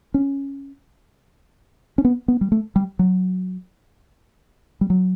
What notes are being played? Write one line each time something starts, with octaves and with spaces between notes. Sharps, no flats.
C#4
C#4
B3
B3
G3
A3
G3
F#3
G3
F#3